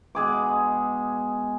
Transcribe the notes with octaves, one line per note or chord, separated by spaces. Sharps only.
B2 G#3 G#4 D6